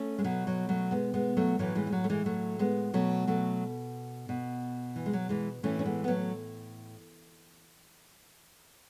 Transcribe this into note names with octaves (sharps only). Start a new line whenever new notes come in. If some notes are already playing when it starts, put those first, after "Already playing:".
Already playing: A3 C#4
G#3
B2 F#3
F#3
F#3 A3
G#3 B3
G#3 B3
F#3 A3
A2 E3 F#3 A3
E3 G#3
G#3
F#3
A3
E3 G#3
F#3 A3
G#3 B3
B2 F#3 A3
F#3 A3
B2
E3
G#3
F#3
E3 G#3
A2 E3 A3 C#4
C#4
G#3 B3
B3
F#3 A3